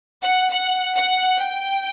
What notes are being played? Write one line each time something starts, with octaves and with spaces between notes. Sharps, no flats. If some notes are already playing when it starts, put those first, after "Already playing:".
F#5
F#5
F#5
G5